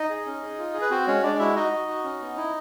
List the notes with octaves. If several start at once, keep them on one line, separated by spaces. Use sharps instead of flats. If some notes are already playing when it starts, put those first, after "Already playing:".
Already playing: D#4 D#5
G#4
C#4
G#4
F4
G#4
B4
C4 F#4 C5
G#3 C#4 C#5
G#3 D4 D5
E4 F#4 E5
D#4 F#4 D#5
F#4
F#4
C#4
B3
E4